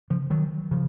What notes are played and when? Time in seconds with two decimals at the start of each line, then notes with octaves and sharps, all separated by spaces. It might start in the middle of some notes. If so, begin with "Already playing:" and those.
0.10 C#3 F3
0.30 D#3 F#3
0.71 C#3 F3